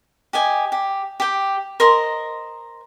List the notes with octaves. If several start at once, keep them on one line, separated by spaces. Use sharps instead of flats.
G4 D#5 G#5
G4
G4 G5
A#4 C5 D#5 C6